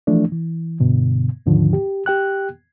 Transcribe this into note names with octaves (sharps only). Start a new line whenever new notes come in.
E3 F3 A3 D4
E3
G2 B2 D3
D#2 G#2 D3 D#3 F3
G4
G4 G5 F#6